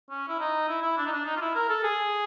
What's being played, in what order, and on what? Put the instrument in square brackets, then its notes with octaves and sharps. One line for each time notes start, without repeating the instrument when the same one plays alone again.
[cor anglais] C#4
E4
D#4
E4
E4
D4
D#4
D4
D#4
F4
E4
A#4
A4
G#4